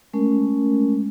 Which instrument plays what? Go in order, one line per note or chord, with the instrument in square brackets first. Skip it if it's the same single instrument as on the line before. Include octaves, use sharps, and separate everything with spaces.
[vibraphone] G#3 A3 C#4 A#4